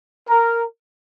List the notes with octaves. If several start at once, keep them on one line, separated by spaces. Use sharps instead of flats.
A#4